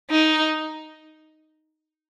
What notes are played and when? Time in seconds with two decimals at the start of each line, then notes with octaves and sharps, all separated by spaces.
0.10 D#4